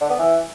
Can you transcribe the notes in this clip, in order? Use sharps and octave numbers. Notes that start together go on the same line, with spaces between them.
D3
B3
E3